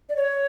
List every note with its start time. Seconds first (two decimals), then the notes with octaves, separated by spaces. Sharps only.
0.09 D5
0.16 C#5